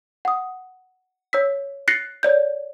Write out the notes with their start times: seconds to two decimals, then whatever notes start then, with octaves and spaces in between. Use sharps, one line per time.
0.25 F#5 D#6
1.33 C#5 E6 B6
1.88 F#6 A6 A#6 C7 C#7
2.23 C#5 D5 G6